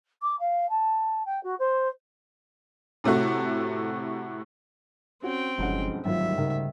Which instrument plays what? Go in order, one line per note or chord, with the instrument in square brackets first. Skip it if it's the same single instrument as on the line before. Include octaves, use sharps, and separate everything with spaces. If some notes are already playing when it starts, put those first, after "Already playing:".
[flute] D6
F5
A5
G5
F#4
C5
[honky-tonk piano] A2 C3 A3 F#4
[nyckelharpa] C4 G5 [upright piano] C#4 F#4
[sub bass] F#1 [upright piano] B1 G2 F#5 [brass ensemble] F3 G#3 C#4
[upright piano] G#1 F4 [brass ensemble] D2 D#3 G3 [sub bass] F#3 [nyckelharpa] E5
[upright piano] G#1 A#4 [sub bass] C#3